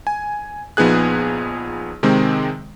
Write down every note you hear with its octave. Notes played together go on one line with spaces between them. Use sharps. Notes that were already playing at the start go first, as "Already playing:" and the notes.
G#5
A#1 F3 B3 D#4 G#4 F#6
C3 D#3 G#3 C4